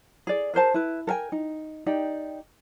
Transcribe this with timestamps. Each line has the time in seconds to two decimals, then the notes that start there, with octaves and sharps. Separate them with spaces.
0.27 G#4 D5
0.54 G#4 A#4 C5 A5
0.74 E4 B4
1.07 A4 A#4 G5 G#5
1.32 D#4
1.86 D#4 G4 D5 G5